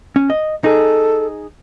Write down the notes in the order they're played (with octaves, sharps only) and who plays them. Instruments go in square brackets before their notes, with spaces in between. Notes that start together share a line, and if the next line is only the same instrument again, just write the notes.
[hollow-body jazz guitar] C#4
D#5
[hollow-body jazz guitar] D#4 G#4 [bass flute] A4